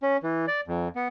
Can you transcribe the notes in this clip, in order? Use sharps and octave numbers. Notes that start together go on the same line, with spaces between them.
C#4
E3
D5
F2
B3